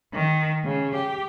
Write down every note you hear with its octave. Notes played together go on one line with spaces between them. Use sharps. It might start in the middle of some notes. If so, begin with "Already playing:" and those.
D#3
C#3
G4